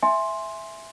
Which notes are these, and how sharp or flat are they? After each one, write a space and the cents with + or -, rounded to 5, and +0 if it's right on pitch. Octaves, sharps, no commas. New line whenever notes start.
E5 +0 G#5 +0 C6 +5